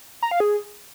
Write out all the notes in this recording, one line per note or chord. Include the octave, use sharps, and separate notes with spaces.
A#5
F5
G#4